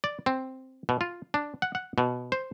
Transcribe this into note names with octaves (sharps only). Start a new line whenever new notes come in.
D5
C4
B2
F4
D4
F#5
F#5
B2
C5